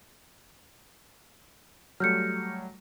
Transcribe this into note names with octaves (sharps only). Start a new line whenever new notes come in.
F#3 G3 A3 F6 G6 C#7